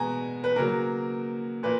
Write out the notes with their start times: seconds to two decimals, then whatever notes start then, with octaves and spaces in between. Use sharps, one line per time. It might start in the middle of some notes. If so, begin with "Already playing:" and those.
Already playing: B2 G#3 B3 G#5 A#5
0.44 B4
0.56 C#3 F#3 A#3 A#4
1.63 A#2 A#3 B4